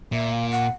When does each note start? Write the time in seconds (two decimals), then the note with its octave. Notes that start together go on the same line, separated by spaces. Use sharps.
0.12 A#2 E5
0.32 F5
0.51 F#5